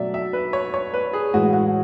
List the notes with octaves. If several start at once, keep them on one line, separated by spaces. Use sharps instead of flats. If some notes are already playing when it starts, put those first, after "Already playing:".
Already playing: B2 F#3 A3 D5 E5
E5
B4
C#5
C#5
B4
G#4
A2 E3 G#3 F#4
F#4